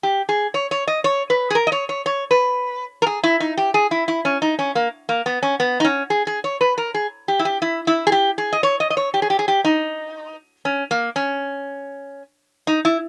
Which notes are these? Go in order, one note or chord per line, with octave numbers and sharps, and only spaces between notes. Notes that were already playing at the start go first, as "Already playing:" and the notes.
G4
G#4
C#5
C#5
D#5
C#5
B4
G#4
A#4
D#5
C#5
C#5
C#5
B4
A#4
G#4
E4
D#4
G4
G#4
E4
E4
C#4
D#4
C#4
A#3
A#3
B3
C#4
B3
D#4
C#4
G#4
G#4
C#5
B4
A#4
G#4
G4
E4
G4
E4
E4
G#4
G4
G#4
D#5
C#5
D#5
D#5
C#5
G4
G#4
G4
G#4
G4
D#4
C#4
A#3
C#4
D#4
E4